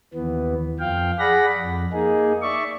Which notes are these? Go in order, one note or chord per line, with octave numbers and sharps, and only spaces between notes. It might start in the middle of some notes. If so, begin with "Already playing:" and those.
D#2 E3 B3
F2 F3 F5 G5
G#4 D5 F#5 B5 A#6
F2
A#3 D#4 G#4
D5 E5 C#6